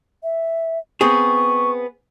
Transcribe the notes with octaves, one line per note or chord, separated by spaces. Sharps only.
E5
B3 C4 G#4 C#6